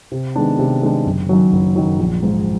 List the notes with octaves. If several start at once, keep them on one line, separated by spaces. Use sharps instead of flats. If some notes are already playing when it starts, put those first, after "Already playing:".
C3
D#3 G#3 B3 D4
C3
D#3 G#3 B3 D4
F#1
F#2 D#3 F#3
F#1
F#2 D#3 F#3
A#1
G#2 F3